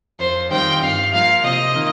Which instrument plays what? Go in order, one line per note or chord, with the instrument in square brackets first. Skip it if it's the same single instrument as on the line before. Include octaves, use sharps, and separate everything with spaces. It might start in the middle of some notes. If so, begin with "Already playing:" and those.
[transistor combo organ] F2 [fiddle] C5
[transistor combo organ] D#3 G3 C4 F4 [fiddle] G5
[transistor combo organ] G2 [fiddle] F5
[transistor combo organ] F3 A#3 F4 [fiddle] F5
[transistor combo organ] C3 [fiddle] D#5
[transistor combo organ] D#3 A#3 F4